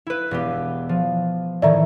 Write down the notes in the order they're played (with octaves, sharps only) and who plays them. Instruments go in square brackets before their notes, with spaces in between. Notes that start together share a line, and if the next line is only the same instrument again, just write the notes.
[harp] E4 B4
E1 B3 G4
F3
[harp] A2 D#3 E3 [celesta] D5 E5 A#5